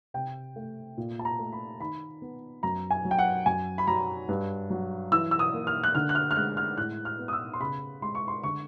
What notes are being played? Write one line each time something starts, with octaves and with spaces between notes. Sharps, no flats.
C3 G5
A3
A#2
A5
A#5
A3
B5
D#3 B5
B3
F#2 A#5
G#5
F#3
G5
F#5
F#2 G#5
B5
F#3 A#5
G2
F#3
E3 E6
E6
D#6
A#3
F6
F#6
D3 F6
F#6
F6
F6
G#3 F#6
F6
A2 F#6
F6
B3
D#6
E6
C6
C#3 B5
G#3 C6
C#6
C6
D3 C#6